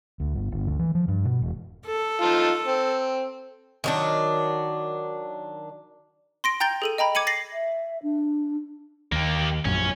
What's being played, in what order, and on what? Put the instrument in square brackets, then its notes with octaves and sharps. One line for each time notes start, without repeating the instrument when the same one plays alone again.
[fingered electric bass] D2
G1
G1
D2
E3
F3
G2
B2
E1
[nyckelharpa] A4
[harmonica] D#4 F4 A5
C4
[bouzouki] D#3 F#3 D4
[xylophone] C6 A#6 D7
G5 A#5 G6 A6 D7 G7
G#4 A4 D#7
D#5 G5 A#5 B5
D6 G#6 C#7 D#7 F#7
A6 A#6 C7 F#7
[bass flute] E5
D4
[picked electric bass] D#2 [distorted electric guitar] A#3 G4
[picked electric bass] A#1 F#2 [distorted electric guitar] C#4